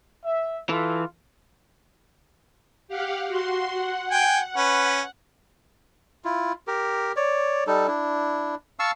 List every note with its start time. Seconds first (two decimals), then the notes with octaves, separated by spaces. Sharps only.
0.25 E5
0.69 E3 F4 A4
2.88 G4 F5 F#5
3.28 F#4 C6
3.73 F#5
4.11 G5 G#5
4.56 C#4 B4
6.25 E4 F4
6.67 G4 A#4
7.16 C#5 D5
7.67 G3 D#4 A4
7.88 D4 E4
8.79 F5 A5 C#6 E6